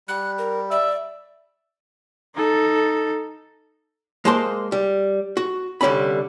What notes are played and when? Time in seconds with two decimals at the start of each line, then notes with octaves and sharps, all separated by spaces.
0.08 G3 F#6
0.38 A#4
0.71 D5 E5
2.35 D#4 A4
4.25 G#3 A#3 C5 A5 C6
4.72 G3
5.37 F#4
5.81 C2 D3 G3 C#4 B5